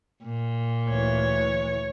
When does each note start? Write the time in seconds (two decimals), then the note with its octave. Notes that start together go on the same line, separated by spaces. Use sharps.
0.24 A#2
0.89 D2 E3 C#5